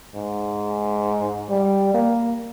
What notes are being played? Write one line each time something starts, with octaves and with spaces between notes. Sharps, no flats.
G#2
G3
A#3